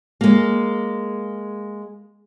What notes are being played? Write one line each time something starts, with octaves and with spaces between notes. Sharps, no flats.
G#3 A#3